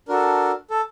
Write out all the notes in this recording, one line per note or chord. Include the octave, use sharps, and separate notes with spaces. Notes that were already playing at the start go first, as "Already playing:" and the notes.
D4 F#4 A4 A#4
A4